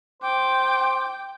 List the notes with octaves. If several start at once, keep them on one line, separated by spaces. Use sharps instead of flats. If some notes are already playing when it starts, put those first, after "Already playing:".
C5 G5 D6